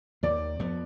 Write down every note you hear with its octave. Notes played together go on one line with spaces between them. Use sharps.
D#2 D#3 A#3 D5
F2 F3 B3